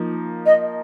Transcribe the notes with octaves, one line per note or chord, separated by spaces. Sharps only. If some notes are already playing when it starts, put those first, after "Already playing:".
Already playing: F3 A#3 D#4
D#5